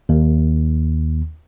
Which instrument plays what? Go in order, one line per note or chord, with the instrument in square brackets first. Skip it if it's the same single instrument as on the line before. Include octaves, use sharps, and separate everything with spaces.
[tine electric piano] D#2